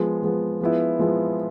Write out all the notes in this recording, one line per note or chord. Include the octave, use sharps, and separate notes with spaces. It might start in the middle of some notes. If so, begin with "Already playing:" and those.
Already playing: F3 G#3 B3
F3 G#3 B3
F3 G#3 B3 E4
F3 G#3 B3 E4